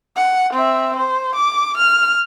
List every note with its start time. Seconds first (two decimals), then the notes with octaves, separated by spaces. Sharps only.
0.16 F#5
0.53 C4 E5
0.96 C5
1.35 D6
1.77 F6